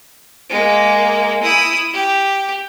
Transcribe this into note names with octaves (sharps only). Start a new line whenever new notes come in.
G#3 A#3
E4 D#6
G4